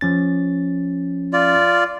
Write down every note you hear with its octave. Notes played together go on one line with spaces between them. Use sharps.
F3 C#4 A6
F4 D5